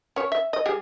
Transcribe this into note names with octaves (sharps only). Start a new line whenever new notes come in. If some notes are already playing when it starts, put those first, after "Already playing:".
C#4 C#5
E5
D#5
G3 G4 G#4